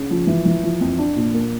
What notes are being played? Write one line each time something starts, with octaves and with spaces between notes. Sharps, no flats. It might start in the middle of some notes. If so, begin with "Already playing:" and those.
Already playing: C#3
F3
E3
E3
F3
F2
D4
A#2
A#3